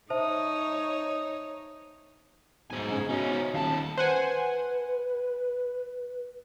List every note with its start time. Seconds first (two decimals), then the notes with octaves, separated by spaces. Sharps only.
0.10 D#4 C5 C#5 E5 A5 D#6
2.70 B1 G#2 G#5
2.91 C#3
3.10 B2 C#4 D#4
3.54 D#1 D#2 A5
3.97 B4 C5 F#5 G#5